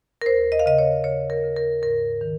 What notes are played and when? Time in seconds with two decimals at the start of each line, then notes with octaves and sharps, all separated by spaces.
0.22 A#4
0.26 D#2 C5
0.52 D#5
0.59 F5
0.66 C#3 D#5
0.78 C#5
1.04 C#3 C#5
1.30 A#4
1.44 C#3
1.57 A#4
1.82 G#2 A#4
2.21 D#3